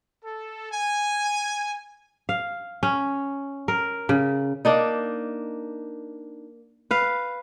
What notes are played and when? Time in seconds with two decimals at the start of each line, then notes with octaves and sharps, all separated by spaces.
0.23 A4
0.72 G#5
2.29 F5
2.83 C#4
3.68 A#4
4.09 C#3
4.65 A#3 D4 D#4
6.91 B4 F5